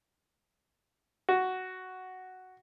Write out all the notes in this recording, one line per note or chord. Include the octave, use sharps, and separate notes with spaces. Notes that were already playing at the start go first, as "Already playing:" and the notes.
F#4